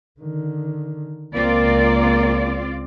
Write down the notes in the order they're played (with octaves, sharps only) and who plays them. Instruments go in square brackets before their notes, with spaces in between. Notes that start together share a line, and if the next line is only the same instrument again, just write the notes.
[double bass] D3 D#3
[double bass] C#2 [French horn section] A#3 [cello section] C4 F4 D5